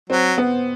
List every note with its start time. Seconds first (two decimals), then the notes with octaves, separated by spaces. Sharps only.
0.10 F#3 C4
0.38 B3